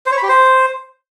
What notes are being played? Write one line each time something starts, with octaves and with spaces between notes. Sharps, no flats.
C5
C#5
B5
G4
C5